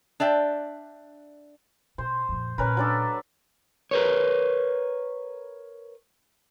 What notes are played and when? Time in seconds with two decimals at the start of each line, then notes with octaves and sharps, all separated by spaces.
0.20 D4 D5 E5 G5
1.98 B2 C5
2.29 F2 A#2
2.58 A#2 C#3 C#4 A#4 B4
2.77 F#3 D4 A4
3.91 A#4 B4 C#5